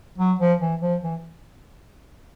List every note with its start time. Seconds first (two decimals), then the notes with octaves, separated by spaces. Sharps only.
0.18 F#3
0.39 F3
0.60 E3
0.81 F3
1.03 E3